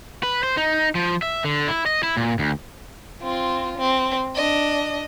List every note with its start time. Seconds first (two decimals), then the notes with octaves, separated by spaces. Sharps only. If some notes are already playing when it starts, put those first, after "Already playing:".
0.23 B4
0.43 C5
0.57 D#4
0.95 F3
1.22 E5
1.44 D3
1.68 E4
1.86 D#5
2.03 E4
2.17 A#2
2.39 D2
3.22 C4 F4
3.78 C4
4.36 D4 D#5